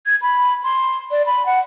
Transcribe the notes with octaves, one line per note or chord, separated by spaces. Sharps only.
G#6
B5
C6
D5
B5
F#5